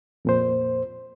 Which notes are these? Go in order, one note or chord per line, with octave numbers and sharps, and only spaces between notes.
F2 A#2 C5